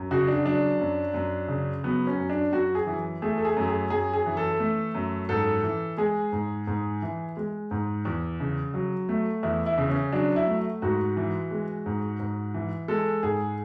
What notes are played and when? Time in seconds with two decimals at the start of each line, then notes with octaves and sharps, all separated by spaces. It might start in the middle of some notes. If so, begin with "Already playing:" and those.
Already playing: F#2
0.11 C#3 F#4
0.27 D4
0.45 F#3 D4
0.80 F#2
1.14 F#2
1.48 C#3
1.84 F#3 B3
2.07 C#4
2.18 F#2
2.30 D4
2.52 F#2 F#4
2.75 G#4
2.86 E3
3.22 A3 G#4
3.37 A4
3.45 G#4
3.57 F#2
3.68 G#4
3.90 F#2 G#4
4.13 G#4
4.26 E3
4.37 A4
4.60 A3
4.95 F#2
5.29 G#2 A4
5.63 E3
5.97 G#3 G#4
6.32 G#2
6.67 G#2
7.02 E3
7.37 G#3
7.71 G#2
8.05 E2
8.40 C#3
8.74 F#3
9.09 A3
9.43 E2 E4
9.66 E4
9.78 C#3
9.90 C#4
10.13 F#3 D4
10.36 E4
10.47 A3
10.82 G#2 F#4
11.17 E3
11.51 G#3
11.86 G#2
12.20 G#2
12.54 E3
12.88 G#3 A4
13.23 G#2 G#4